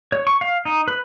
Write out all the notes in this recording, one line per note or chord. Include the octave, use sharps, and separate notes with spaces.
C#5
C#6
F5
D#4
B4